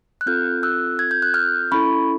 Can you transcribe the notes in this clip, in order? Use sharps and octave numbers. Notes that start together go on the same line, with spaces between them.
F#6
C4 F4 A4 F6 G6
E6 F#6
G#6
G6
F#6
F6 G6
C#4 E4 A4 B5 C#6